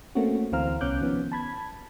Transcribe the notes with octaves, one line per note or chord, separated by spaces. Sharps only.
A3 A#3 C4 C#4 F#4
D2 E3 C4 F5 A#5 F6
C2 B3 C#4 D6 F#6 G6
D#3 F3 B3 C#4
A5 B5 G#6